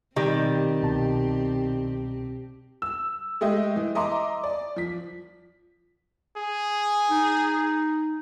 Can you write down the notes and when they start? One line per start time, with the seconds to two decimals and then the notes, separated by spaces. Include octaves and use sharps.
0.16 B2 D#3 G3 C4 G4
0.82 C2 B2 A5
2.82 E6
3.41 G#3 A3 G4 D#5 E5
3.76 E3
3.95 D#5 E5 A#5 C6 D6
4.44 D5
4.76 F3 B6
6.37 G#4
7.11 D#4